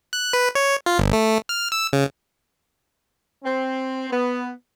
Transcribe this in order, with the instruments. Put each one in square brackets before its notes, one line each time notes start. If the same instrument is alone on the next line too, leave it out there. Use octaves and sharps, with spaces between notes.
[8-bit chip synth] F#6
B4
C#5
F4
G1
A3
F6
E6
C#3
[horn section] C4
B3